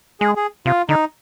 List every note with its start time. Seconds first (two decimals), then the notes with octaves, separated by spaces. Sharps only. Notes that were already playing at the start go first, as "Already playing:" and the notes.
0.20 G#3 G#4
0.36 G#4
0.66 C3 F4
0.89 D3 D#4